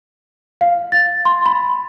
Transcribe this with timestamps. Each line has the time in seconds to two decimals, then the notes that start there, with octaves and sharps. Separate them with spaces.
0.61 F5
0.92 A6
1.25 C6
1.46 B5